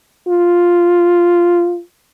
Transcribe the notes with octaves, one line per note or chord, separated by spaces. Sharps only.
F4